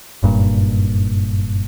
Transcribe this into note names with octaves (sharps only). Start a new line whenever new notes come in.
F#1 G2 A#2